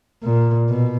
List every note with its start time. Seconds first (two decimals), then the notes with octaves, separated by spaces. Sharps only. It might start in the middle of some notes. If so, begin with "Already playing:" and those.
0.24 A#2
0.69 B2